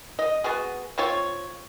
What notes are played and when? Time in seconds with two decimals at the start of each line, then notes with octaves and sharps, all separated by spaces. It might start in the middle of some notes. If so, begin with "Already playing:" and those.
0.19 D#5
0.44 B3 F#4 G#4
0.98 C4 F4 C#5